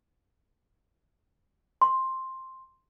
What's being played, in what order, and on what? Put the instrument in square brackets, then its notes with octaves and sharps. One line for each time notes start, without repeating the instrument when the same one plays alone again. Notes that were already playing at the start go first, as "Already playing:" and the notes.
[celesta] C6